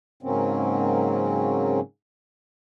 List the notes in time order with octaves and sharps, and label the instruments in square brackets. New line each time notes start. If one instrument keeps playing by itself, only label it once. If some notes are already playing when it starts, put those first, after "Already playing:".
[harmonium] G#2 C#3 F#3 A#3 C4 C#4